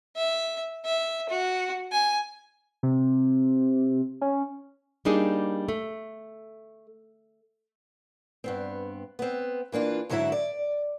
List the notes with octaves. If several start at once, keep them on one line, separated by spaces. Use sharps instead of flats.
E5
E5
F#4
G#5
C3
C#4
G3 A#3 D4 D#4 G#4
A3
G2 B3 C4
B3 C4
E3 A#3 D4 F4
G#2 D3 F#3 E4 A4 E5
D5